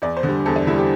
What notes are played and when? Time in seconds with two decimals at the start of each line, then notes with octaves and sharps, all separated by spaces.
0.02 E2 D5
0.16 C5
0.23 D3
0.28 G3
0.45 E2 A4
0.56 D4
0.67 D3 G3 E4
0.78 G4